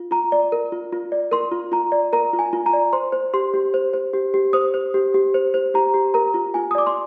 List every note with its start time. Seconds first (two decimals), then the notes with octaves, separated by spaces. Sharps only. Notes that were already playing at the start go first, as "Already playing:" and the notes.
Already playing: F4
0.11 F4 A#5
0.32 D5
0.52 A#4
0.72 F4
0.92 F4
1.12 D5
1.31 A#4 C6
1.52 F4
1.72 F4 A#5
1.92 D5
2.13 A#4 A#5
2.33 F4
2.39 G#5
2.53 F4
2.66 A#5
2.73 D5
2.93 C5 C6
3.12 C5
3.34 G4 C6
3.54 G4
3.74 C5
3.94 C5
4.14 G4
4.34 G4
4.53 C5 D#6
4.74 C5
4.94 G4
5.14 G4
5.34 C5
5.54 C5
5.74 G4 A#5
5.94 G4
6.14 A#4 A#5
6.34 F4
6.54 F4 G#5
6.71 D#6
6.75 D5 D6
6.87 C6